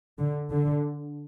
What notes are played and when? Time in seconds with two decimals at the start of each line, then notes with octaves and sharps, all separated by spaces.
0.19 D3
0.51 D3